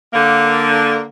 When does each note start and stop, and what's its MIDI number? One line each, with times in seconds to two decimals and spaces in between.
0.13 1.02 50
0.13 1.02 58